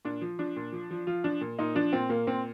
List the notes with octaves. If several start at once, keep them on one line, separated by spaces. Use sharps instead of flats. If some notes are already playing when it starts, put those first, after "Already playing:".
A#2 D4
F3
F3 D4
A#2
F3
F3
F3 F4
F3 D4
A#2
A#2 D#4
F3 D4
A#2 C4
A#2 A#3
A#2 C4